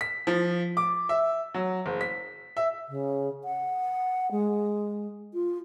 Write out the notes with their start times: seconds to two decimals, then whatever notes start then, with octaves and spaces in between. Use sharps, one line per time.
0.01 B6
0.27 F3
0.77 D6
1.09 E5
1.54 F#3
1.86 F#1
2.01 B6
2.57 E5
2.89 C#3
3.44 F#5
4.31 G#3
5.34 F4